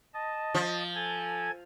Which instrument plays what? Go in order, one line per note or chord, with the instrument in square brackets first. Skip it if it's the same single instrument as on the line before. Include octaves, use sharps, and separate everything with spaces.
[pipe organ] D#5 A5
[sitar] F3
[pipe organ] A4 G#5 G#6